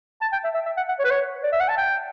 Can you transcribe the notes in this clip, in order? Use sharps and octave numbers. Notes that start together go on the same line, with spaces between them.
A5
G5
E5
E5
E5
F#5
F#5
C#5
B4
C#5
D5
E5
F#5
A5
G5